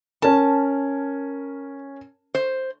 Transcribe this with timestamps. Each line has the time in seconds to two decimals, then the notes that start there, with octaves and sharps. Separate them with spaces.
0.22 C#4 A#4 A5
2.35 C5